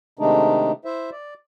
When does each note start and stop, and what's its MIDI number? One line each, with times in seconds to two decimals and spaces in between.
0.19 0.72 48
0.19 0.72 51
0.19 0.72 56
0.19 0.72 57
0.19 0.72 62
0.19 0.72 63
0.85 1.10 64
0.85 1.10 72
0.85 1.10 76
1.11 1.34 74